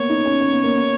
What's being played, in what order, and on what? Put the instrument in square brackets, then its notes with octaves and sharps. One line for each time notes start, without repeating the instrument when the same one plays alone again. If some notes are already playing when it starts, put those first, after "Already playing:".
Already playing: [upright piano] A#3 B3 [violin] C#5
[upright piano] D#4
C#4
C#4
B3
A#3
B3